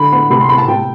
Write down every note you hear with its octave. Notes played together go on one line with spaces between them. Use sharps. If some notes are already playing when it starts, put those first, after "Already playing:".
Already playing: D3 B5
B3 B5
C3 B5
C6
B3 B5
A5
C3 G5